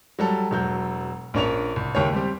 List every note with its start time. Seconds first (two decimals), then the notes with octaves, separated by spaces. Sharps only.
0.19 F#3 G3 A4
0.51 E1 F#3 G6
1.34 A#1 C#4 D4 A#4 C#5 F7
1.76 C2
1.95 F#1 D#2 G4 C#5
2.13 G3 C4 G4